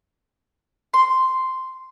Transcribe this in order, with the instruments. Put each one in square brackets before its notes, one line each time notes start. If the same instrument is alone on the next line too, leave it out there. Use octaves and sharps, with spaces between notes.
[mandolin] C6